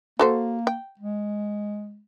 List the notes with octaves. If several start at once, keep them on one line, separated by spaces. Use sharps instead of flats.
A#3 F#4 A4 C5
G5
G#3